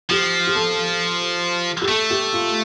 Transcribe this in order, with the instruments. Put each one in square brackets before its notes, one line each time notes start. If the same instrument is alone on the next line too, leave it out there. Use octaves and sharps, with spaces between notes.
[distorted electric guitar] F3 [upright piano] G4
[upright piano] G4
A4
G4
[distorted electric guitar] A3 [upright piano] A4
[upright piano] G4
F4